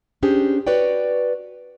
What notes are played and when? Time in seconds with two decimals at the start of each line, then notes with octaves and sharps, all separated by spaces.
0.23 C#4 D4 G4 G#4 C5
0.67 F#4 B4 C#5 D5 G5